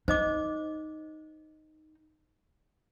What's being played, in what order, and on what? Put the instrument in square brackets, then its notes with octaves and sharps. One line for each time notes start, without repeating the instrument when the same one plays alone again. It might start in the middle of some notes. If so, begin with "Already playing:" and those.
[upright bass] D#4 [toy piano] C5 D#5 D6